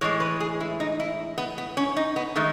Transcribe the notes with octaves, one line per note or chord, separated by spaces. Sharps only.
A2 E3 G#3 C#5
B4
G#4
E4
D#4
E4
B3
B3
C#4
D#4
B3
D#3 G#3 A3